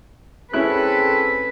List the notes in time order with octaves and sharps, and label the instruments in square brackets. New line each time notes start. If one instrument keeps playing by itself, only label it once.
[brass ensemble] C4 G#4 A4 [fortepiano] C#4 E4 F#6 [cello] B4